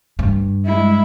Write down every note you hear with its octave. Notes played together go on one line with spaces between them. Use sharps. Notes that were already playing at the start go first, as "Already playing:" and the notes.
G2
G#3 E4